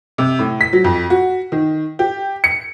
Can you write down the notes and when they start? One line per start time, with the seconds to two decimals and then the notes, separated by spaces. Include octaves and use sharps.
0.18 C3
0.39 A2
0.61 B6
0.73 F#3
0.84 F2
1.10 F#4
1.52 D#3
1.99 G4
2.44 C#7